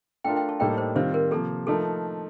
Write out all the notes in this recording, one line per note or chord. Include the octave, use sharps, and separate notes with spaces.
A3 D4 F4 A#4 G5
G5
A5
A2 G3 A#3 D#4 A4 G5
C5
D#3 G3 C4 F4 C5
A#4
C3 F3 A#3 A4
F3 A3 D#4 A4 A#4